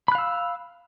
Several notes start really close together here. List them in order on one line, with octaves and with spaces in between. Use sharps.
B5 F#6 F5 E6